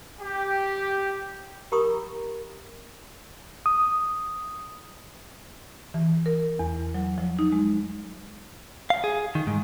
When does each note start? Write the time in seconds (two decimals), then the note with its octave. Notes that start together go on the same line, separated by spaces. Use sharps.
0.21 G4
1.72 G4 A#4 A#5 B5 C#6 D#6
3.66 D#6
5.94 E3
6.26 A#4
6.59 E2
6.94 F#3
7.18 F3
7.39 D#4
7.52 G#3
8.90 F5
9.04 G#4
9.35 D#3
9.47 G#2